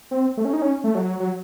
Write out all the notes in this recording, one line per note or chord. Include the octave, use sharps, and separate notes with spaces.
C4
A3
C#4
D#4
C#4
A3
F#3
F#3